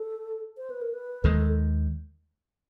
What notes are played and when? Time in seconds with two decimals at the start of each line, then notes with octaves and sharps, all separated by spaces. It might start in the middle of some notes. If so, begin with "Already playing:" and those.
Already playing: A4
0.58 C5
0.70 B4
0.81 A#4
0.94 B4
1.24 D#2 D#3 G#3 A4